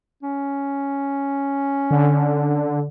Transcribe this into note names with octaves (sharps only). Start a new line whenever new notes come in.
C#4
D3